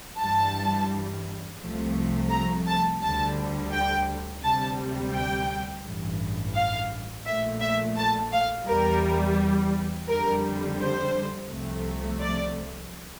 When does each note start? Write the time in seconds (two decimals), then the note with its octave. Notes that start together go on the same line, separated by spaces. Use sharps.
0.19 G2 E3 G3 A5
1.61 C2 C3 F3 A3
2.31 A#5
2.67 A5
3.02 D2 D3 G3 A5
3.72 G5
4.43 D2 C3 G3 A5
5.14 G5
5.85 A1 G2 E3
6.55 F5
7.26 A#1 A#2 A3 E5
7.61 E5
7.97 A5
8.32 F5
8.67 E2 E3 G3 A#4
10.08 F2 D3 G3 A#4
10.79 C5
11.50 C2 C3 F3 A3
12.20 D5